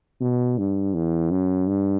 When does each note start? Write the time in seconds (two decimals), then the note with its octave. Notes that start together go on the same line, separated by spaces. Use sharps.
0.21 B2
0.58 G2
0.94 E2
1.31 F#2
1.67 G2